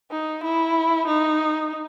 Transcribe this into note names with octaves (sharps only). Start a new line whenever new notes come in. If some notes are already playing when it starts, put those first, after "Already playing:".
D#4
E4
D#4